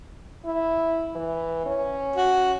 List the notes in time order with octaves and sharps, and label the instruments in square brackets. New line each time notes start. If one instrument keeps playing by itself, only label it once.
[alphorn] E4
E3
C#4
[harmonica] F#4